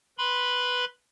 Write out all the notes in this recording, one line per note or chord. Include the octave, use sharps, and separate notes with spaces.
B4 B5 C6